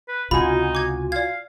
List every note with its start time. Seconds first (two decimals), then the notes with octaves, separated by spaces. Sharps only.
0.08 B4
0.31 C#2 C3 D#4 F4 F#4 G#5 B5
0.75 D6 G#6
1.12 D5 F5 G#6